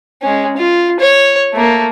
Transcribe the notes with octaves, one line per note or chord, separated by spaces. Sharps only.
G#3 C#4
F4
C#5
A3 A#3